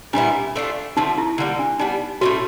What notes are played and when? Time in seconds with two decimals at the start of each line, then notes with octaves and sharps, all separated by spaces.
0.13 A#2 G3 B3 D4 E4
0.56 A3 D4 F4
0.97 D3 F3 A3 D#4
1.18 E4
1.38 D3 G3 A#3
1.59 D4
1.79 G3 B3 D4 D#4
2.21 A2 E3 A3 C#4 F#4